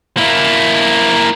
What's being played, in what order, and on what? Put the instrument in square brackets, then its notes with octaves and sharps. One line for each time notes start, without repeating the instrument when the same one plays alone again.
[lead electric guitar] A#3 E4